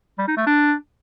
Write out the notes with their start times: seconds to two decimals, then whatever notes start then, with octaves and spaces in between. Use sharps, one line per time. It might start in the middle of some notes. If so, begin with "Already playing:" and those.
0.18 G3
0.28 D#4
0.37 A3
0.46 D4